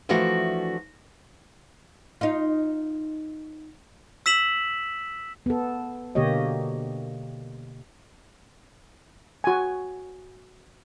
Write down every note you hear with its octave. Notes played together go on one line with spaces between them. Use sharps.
E3 F3 A3 D4 F#4
D#4 F4
E6 B6 E7 F#7
B3 A4
B2 D3 A#3 G4 C#5 D#5
F#4 G#5